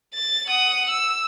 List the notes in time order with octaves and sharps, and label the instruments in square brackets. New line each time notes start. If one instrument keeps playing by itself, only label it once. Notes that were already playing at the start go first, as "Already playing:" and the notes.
[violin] A6
F#5 D#6
E6